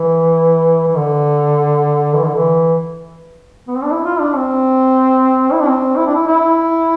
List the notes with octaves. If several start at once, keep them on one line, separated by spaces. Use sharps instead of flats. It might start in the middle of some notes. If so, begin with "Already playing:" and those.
Already playing: E3
E3
D3
E3
D3
E3
B3
C4
D4
E4
F4
D4
C4
E4
D4
C4
E4
D4
E4
E4